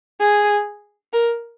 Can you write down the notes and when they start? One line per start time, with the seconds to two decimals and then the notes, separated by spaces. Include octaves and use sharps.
0.21 G#4
1.13 A#4